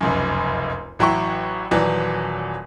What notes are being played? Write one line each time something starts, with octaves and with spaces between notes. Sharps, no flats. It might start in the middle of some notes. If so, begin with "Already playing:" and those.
F1 C#2 F#2
A1 F#3 E4 G5 C#6
D#1 E3 F#3 D5